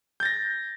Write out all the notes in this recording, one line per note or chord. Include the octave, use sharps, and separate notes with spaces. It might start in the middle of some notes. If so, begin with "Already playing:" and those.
G6 A6 A#6